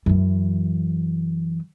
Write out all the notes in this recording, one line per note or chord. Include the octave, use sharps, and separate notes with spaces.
F#2 E3